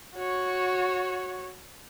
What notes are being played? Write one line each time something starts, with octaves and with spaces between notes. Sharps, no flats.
F#4 C#5